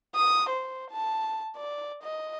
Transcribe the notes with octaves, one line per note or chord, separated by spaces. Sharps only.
D#6
C5
A5
D5
D#5